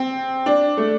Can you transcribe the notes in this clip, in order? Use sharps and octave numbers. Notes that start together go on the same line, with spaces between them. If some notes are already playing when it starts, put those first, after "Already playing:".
Already playing: C4
D4
A3